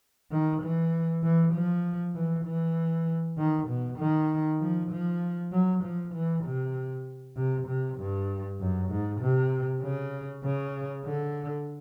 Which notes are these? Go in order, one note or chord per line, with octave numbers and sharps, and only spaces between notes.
D#3
E3
E3
F3
E3
E3
D#3
B2
D#3
F3
F3
F#3
F3
E3
C3
C3
C3
G2
F#2
G#2
C3
C#3
C#3
D3